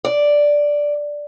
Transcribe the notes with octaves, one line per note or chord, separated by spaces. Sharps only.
D5